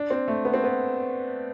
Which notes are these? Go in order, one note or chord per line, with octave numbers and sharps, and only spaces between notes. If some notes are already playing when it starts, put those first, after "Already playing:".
Already playing: D4
C4
A3
B3
C4
B3